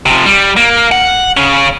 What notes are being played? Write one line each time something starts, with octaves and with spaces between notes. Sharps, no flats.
C3 F3
G3
A#3
F#5
C#3 C#4